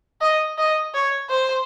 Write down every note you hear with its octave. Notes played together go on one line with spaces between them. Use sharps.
D#5
D#5
C#5
C5